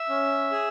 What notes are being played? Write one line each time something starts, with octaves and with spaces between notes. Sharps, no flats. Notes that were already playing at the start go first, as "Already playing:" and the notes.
Already playing: E5
C#4
G#4